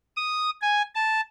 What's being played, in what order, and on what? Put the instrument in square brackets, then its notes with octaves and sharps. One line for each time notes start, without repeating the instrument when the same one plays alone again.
[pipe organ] D#6
G#5
A5